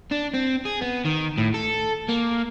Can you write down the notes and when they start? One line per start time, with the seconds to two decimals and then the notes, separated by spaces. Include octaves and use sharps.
0.11 D4
0.34 C4
0.65 G#4
0.81 B3
1.05 D#3
1.38 A2
1.54 A4
2.08 A#3